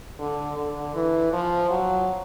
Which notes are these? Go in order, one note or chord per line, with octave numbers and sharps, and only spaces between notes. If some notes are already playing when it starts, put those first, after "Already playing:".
D3
D3
E3
F3
F#3